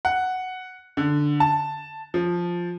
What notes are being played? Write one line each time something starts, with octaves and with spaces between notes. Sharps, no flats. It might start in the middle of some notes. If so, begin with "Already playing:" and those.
F#5
D3
A5
F3